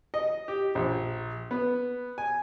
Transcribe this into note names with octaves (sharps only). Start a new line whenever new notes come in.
D#5
G4
A#1
B3
G#5